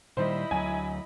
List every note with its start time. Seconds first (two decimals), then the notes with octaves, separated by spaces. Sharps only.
0.17 A#2 D#3 G3 E4 C5 D#5 B5
0.51 D2 F#3 G#5